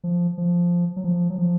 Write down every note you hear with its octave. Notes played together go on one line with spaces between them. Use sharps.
F3
F3
F#3
F3
F#3
F3